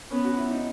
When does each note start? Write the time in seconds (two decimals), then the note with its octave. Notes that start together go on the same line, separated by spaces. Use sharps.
0.11 B3 C#4
0.24 F#4
0.37 E4
0.51 D#4